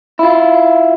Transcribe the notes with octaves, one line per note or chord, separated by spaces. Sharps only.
E4 F4